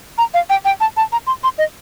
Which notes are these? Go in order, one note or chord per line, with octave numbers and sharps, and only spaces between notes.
A#5
F5
G5
G5
A5
A5
A#5
C6
C6
D#5